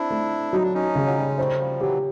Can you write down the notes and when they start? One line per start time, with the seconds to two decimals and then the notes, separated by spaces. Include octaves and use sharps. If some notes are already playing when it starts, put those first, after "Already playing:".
Already playing: C4 D4 E4
0.10 A3
0.53 F#3 D#4
0.63 D4
0.74 C#4 D#4
0.95 C#3
1.06 F#3
1.17 G3
1.28 G#3
1.38 G3 A3 C5
1.59 F3 G3
1.80 E3 F#3 G4